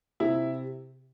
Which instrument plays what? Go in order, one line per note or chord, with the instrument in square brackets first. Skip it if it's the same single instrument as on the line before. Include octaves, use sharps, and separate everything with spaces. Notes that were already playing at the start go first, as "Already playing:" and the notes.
[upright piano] C3 E4